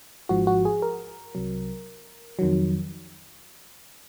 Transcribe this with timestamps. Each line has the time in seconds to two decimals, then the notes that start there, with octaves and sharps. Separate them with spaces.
0.29 G#1 G#2 F3 F#4
0.47 F#4
0.65 G#4
0.82 A#4
1.35 C2 C3 F#3
2.39 F2 D#3 F#3